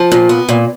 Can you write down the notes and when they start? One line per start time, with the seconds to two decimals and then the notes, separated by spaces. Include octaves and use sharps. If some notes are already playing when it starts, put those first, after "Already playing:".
Already playing: F3
0.12 A#2
0.29 B3
0.49 A#2